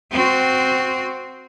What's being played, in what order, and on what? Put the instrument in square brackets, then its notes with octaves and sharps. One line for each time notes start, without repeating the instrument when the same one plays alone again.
[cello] C4 F#4